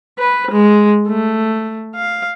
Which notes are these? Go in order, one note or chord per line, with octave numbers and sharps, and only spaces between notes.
B4
G#3
A3
F5